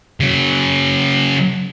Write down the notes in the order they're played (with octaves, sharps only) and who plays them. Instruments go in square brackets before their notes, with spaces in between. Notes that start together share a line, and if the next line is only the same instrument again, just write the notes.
[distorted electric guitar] C#3 F#3